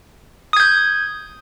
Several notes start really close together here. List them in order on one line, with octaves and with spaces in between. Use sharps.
D#6 G#6 G6